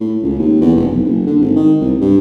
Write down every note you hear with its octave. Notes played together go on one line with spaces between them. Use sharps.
A2
C#2
D#2
E2
F1
B1
F#1
D3
G#1
D#3
C2
G2